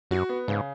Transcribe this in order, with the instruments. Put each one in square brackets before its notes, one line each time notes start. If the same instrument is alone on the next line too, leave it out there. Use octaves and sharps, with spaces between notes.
[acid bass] F#2 [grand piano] F#4
[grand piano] B3
[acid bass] G#2 [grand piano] C#3